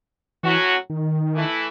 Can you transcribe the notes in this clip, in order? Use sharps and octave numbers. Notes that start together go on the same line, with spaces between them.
A2 E3 F#3 C#4 F#4
D#3
E3 A3 E4